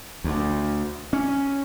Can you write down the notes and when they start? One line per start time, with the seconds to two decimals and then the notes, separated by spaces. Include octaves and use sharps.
0.24 D2
1.13 C#4